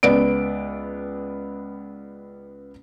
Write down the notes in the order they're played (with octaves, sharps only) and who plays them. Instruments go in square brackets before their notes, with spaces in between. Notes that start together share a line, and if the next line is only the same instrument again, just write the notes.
[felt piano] C#2 B3 D5 D7